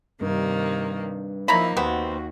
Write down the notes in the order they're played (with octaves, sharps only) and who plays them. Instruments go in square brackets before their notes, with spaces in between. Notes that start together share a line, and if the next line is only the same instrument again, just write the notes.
[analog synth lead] G2 [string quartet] C3 D#3 A#3
[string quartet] F3 A#3 D#4 [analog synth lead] E4 [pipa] C#5 A#5 B5
[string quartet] D#2 [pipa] C3 B3 C4 [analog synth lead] F#4